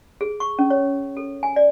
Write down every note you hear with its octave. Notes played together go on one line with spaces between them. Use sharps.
G#4
C#6
C#4
C#5
A4
G#5
D5